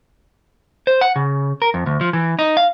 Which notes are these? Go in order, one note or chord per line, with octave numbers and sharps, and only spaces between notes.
C5
F#5
C#3
A#4
F2
D2
F3
E3
D#4
F5